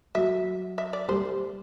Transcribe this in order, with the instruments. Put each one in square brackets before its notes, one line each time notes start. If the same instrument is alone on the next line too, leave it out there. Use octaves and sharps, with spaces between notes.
[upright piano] F#3 [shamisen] E5
[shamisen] E5
D5
[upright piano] G3 [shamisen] C5